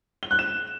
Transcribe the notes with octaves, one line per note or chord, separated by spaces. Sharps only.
G7
F#6
E7